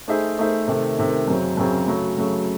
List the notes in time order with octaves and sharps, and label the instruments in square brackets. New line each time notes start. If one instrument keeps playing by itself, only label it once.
[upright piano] A3 D#4 G#4 C5 E5
A3 D#4 G#4 C5 E5
C3 D#3 A3
C3 D#3 A3
F#2 C#3 F#3 C4
F#2 C#3 F#3 C4
C#3 F#3 A3
C#3 F#3 A3